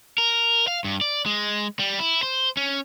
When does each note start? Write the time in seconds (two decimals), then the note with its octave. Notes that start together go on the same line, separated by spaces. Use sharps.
0.18 A#4
0.68 F5
0.84 G2
1.01 D5
1.26 G#3
1.79 G3
1.99 E4
2.23 C5
2.57 C#4